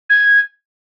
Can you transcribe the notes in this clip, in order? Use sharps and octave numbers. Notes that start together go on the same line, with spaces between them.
G#6